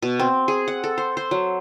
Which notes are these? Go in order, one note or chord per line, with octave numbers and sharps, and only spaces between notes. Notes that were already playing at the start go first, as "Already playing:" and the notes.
B2
C4
G#4
F#5
A4
C5
C5
F#3